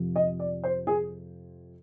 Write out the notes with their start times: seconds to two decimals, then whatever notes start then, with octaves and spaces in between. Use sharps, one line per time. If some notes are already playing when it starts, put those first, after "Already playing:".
Already playing: F2 C3 F3
0.16 D#5
0.39 D5
0.64 C5
0.87 G#4